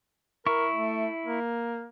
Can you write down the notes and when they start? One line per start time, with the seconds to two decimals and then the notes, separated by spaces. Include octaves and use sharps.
0.46 E4 A#4 C#6
0.71 A3
1.26 A#3